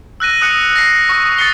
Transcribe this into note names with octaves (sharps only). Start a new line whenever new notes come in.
E6 F#6 A#6 D#7
D#6 F#6 C#7
A#6 C7
C#6 D#6
D#6 A6 C7 C#7 G7